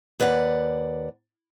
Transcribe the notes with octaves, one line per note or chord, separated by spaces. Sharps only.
D#2 B4 D5 F5 F#5